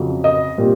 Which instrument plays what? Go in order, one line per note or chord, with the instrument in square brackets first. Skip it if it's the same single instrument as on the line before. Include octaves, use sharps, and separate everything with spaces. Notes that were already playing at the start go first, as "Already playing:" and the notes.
Already playing: [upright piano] F2 C#3 F#3
D#5
A#2 G3 C4